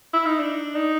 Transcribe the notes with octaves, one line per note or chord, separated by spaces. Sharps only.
E4
D#4
D4
D#4